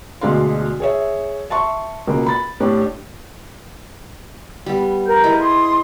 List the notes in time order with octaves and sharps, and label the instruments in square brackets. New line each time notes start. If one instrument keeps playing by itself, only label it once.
[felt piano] D2 B2 G#3 D4 F5 C6
G#4 C#5 E5
E5 A5 C6 C#6
C#2 B2 A#3
B5 A6
A2 D4 G4
[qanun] G3 B3
[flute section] A#4 G6
[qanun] G#3 E4 G#4
[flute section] C6 D#6